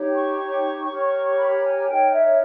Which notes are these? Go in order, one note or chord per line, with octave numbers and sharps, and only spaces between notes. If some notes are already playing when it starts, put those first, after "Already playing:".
Already playing: D#4 G4 C#5
C#6
G4 A#4 C#5
B5
G#5
D#4 A#4 C#5 G5
E5